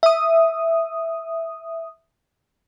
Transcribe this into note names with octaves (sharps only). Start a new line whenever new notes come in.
E5 D#6